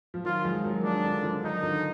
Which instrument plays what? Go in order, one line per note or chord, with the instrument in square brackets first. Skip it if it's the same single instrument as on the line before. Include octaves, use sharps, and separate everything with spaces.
[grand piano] F3
[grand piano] D#3 F#3 [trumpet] F4
[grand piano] F3 G#3
F#3 A#3
[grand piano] F3 G#3 [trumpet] D4
[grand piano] D3
D3 F3
[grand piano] D#3 F#3 [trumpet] D#4
[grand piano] D3 F3